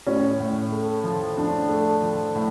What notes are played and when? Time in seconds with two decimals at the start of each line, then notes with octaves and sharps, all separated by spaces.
0.07 A2 C#4
0.39 A2
0.72 A3
1.04 F3
1.37 F3 D4
1.69 A3
2.02 F3
2.35 A2